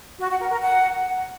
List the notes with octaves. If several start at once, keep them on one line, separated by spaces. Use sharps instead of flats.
F#4
F#5
A#4
A#4
F#5